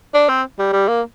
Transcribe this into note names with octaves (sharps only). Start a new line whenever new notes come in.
D4
C4
G3
G3
A#3